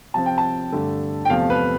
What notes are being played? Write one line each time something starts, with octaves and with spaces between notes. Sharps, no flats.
C3 F3 C4 A5
G5
A5
G2 D3 A3
G5
E2 C3 F3 A3 F5
B4